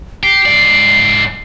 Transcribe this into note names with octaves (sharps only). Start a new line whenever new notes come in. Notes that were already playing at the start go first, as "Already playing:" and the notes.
G4 C7
G#2 D5